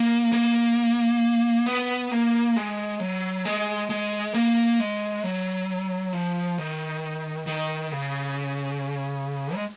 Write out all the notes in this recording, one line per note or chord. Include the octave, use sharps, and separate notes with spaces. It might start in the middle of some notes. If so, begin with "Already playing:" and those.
Already playing: A#3
A#3
B3
A#3
G#3
F#3
G#3
G#3
A#3
G#3
F#3
F3
D#3
D#3
C#3
G#3